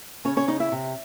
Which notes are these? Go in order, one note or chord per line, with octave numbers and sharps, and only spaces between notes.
C#3 C#4 C#5
C#4 C#5
C#3 D#4 D#5
E4 E5
C3